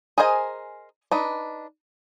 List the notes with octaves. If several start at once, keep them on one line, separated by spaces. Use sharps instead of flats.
G#4 A#4 C5 D#5 G#5
D4 D#4 B4